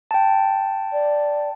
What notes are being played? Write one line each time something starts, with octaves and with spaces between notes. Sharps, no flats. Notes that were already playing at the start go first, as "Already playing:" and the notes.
G5 A5
D5